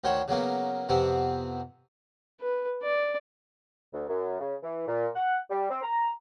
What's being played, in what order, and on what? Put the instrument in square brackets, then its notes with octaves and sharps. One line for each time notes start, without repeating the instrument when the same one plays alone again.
[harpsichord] D2 D#3 C5 C#5 F#5
C#3 F#3 A#3 B3
F2 C3 B3 C4
[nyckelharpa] B4
D5
[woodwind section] D2
F#2
C#3
E3
A#2
F#5
G3
C4
A#5